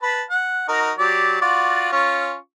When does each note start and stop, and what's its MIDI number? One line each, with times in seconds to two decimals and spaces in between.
0.03 0.23 71
0.03 0.23 81
0.03 0.23 83
0.31 0.65 78
0.68 0.92 63
0.68 0.92 66
0.68 0.92 70
0.98 1.39 54
0.98 1.39 67
0.98 1.39 74
1.41 1.92 65
1.41 1.92 66
1.41 1.92 74
1.92 2.35 61
1.92 2.35 65
1.92 2.35 85